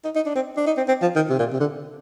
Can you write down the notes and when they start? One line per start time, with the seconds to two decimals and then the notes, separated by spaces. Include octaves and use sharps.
0.04 D#4
0.16 D#4
0.26 D4
0.35 C4
0.57 D4
0.67 D#4
0.77 C4
0.88 C4
1.02 F3
1.16 D#3
1.30 C3
1.39 A#2
1.53 C3
1.60 D3